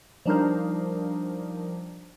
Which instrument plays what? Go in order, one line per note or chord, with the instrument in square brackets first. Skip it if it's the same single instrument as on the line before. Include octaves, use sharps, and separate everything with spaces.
[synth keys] F3 G3 D4 D#4 A#4 C5